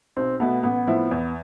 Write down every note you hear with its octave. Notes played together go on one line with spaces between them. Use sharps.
B1 C4
B2 A3 B3
A1 B3
A2 F3 C4 E4
E2